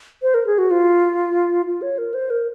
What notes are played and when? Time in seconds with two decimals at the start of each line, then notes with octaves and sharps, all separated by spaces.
0.23 C5
0.34 A#4
0.47 G#4
0.58 F#4
0.71 F4
1.66 F4
1.82 C#5
1.98 A#4
2.14 C5
2.30 A#4